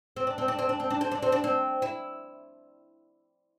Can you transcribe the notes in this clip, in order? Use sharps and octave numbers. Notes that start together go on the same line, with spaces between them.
C4
D4
C4
D4
C4
D4
C4
D4
C4
D4
C4
D4
C4
E4